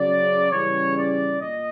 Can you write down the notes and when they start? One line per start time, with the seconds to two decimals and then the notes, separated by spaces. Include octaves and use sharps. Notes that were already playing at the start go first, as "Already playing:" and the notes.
Already playing: C#3 F#3 D5
0.52 C#3 E3 G3 C#5
0.96 D5
1.41 A#2 D#5